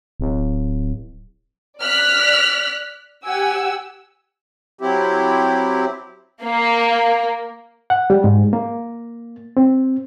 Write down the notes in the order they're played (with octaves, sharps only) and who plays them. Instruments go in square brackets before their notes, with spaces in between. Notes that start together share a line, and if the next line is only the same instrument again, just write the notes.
[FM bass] D1
[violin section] D5 F6 F#6 B6
G4 F#5 G#5 E6
[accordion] F#3 C4 E4 G4
[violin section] A#3
[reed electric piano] F#5
G3
G#2
A#3
C4